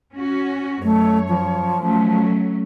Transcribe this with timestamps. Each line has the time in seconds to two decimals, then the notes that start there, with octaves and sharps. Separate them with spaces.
0.13 C#4 F#4
0.83 F#2 A3 C#5
1.28 F3
1.80 F#3 A3 C#4